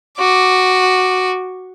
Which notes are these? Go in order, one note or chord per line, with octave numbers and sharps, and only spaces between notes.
F#4 D6